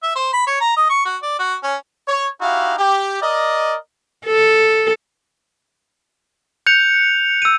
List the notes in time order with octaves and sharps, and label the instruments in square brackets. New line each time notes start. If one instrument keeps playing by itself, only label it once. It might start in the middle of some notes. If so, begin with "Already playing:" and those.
[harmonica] E5
C5
B5
C#5
A#5
D#5
C#6
F#4
D5
F#4
C#4
[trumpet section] C#5
D#4 E4 F#4 G4 F5
G4
A#4 D5 D#5
[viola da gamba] A4
[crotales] F#6 C#7 F7 [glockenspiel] G6
[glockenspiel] E6 D#7